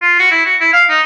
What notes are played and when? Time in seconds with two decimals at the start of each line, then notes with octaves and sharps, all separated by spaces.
0.02 F4
0.19 F#4
0.31 E4
0.46 F#4
0.61 E4
0.73 F5
0.89 D#4